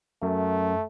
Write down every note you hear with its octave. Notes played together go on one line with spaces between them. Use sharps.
F#2 A3